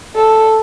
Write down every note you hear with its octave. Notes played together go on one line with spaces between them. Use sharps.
A4